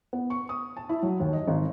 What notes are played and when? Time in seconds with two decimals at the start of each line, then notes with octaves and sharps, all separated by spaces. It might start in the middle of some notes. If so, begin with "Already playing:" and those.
0.13 B3
0.30 C#6
0.49 D#6
0.77 A5
0.89 E4
1.03 F#3
1.20 D#2
1.33 D#5
1.48 G#1